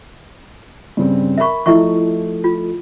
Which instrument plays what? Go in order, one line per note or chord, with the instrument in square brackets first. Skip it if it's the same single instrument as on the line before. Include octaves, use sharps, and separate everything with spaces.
[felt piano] G2 C#3 C4
[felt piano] A#4 B5 [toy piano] E5 C#6
[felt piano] F3 A3 D#5 [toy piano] E4 E5 C#6
[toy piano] F4